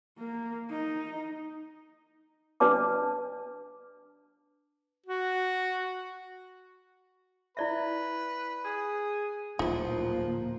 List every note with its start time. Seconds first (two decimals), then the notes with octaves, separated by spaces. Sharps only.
0.18 A#3
0.70 D#4
2.60 D4 B4 D5 A5 D6
5.06 F#4
7.57 E4 B4 D5 E5
8.65 G#4
9.59 D1 D#2 A#2 F3 A#3 D#4 E4